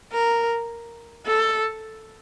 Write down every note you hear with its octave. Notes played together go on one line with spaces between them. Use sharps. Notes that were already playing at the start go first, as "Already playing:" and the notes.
A#4
A4